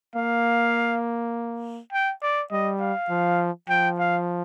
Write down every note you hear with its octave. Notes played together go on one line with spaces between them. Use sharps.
A#3 F5
G5
D5
G3 D#5
F5
F3
F3 G5
F5